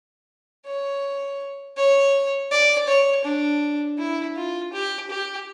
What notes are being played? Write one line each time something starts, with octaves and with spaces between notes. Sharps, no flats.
C#5
C#5
D5
C#5
D4
E4
F4
G4
G4